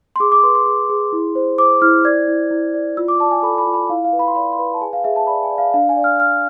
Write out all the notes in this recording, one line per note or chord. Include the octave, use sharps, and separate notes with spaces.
C6
G#4 D6
D6
B4 C6
C6
G#4
G#4
E4
C5
C5 D6
E4 F6
D5 G#6
E4
E4
D5
F4 E6
D6
D5 A5
G#5
A4 B5
B5
F4
B5
E4 F5
F5
B4
B5
C6
D5 B5
C6
B4 B5
A5
G#4 G#5
F5
G#4 E5
A5
D5 B5
G#5
D5
F5
D4 F5
G#5
D5
F6
D5 F6